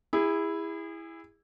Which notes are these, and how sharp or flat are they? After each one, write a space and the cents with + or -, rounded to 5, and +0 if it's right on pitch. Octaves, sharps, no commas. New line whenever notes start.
E4 +0 G#4 -30